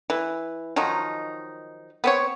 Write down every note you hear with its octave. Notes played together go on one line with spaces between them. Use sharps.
E3
D#3 F3 F#3 D#4
B3 C4 C#5